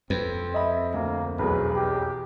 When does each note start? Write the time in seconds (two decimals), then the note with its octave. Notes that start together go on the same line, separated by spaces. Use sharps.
0.10 F2 C4 B4
0.54 D#5 E5 B5
0.94 D2 A#3
1.39 B1 E2 B4
1.75 G4